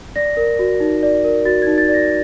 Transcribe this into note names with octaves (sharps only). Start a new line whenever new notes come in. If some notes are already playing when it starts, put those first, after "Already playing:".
D5 A#6
A#4
F#4
D#4
D5
A#4
F#4 A6
D#4 G#6
A6
D5
A#6